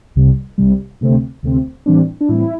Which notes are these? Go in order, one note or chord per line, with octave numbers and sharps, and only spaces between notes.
C2 C3 G3
C2 C3 G3
D2 C3 A3 C4
D2 C3 A3 C4
A2 E3 G3 C4 D4
D4
A2 E3 G3 C4 E4